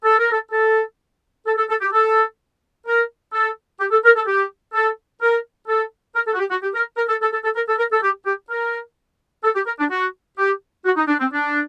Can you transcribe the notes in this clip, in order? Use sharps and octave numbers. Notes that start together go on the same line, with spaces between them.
A4
A#4
A4
A4
A4
A4
A4
G4
A4
A#4
A4
G4
A4
A#4
A4
G4
A4
A#4
A4
A#4
A4
F#4
G4
F#4
G4
A#4
A#4
A4
A4
A4
A4
A#4
A4
A#4
A4
G4
G4
A#4
A4
G4
A#4
D4
F#4
G4
F#4
D#4
D4
C4
D4